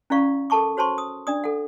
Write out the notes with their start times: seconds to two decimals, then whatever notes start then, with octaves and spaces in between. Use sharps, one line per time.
0.10 C#4 E4 F4 D5 F5 C#6
0.50 A4 A#4 A5 C#6 D6
0.77 F#4 C5 C#5 A5 C6 C#6
0.98 D#6
1.27 D4 D5 D#6
1.44 A4 F#5